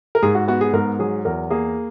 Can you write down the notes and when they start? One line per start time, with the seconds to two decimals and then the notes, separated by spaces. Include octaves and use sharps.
0.15 A#4
0.22 G#2 G#4
0.35 F#4
0.48 B3 F#4
0.61 G#4
0.73 G#2 A#4
0.99 F#3 G#4
1.25 E2 A#4
1.50 A#3 G#4